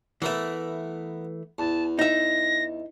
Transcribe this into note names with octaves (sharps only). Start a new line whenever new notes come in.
E3 A3 B3 A#4 E5
E2 A5
D#4 E5 A#6